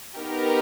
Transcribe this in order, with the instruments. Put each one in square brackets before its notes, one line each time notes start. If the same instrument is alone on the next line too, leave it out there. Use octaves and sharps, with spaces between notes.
[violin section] B3 D#4 G4 A#4